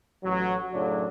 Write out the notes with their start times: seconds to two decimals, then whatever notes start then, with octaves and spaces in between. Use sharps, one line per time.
0.24 A1 F#3
0.73 F#2 A2 C#3 F#3 D4